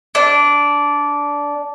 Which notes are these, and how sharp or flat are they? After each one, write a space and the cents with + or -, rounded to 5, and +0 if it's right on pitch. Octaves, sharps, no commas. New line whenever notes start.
D4 -15